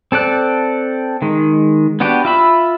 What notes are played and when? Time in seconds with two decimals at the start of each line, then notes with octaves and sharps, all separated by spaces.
0.12 C4 A4 D5 F#6
1.22 D#3 G#3
2.00 B3 D4 F#4 G4 B4
2.25 F4 E5 B5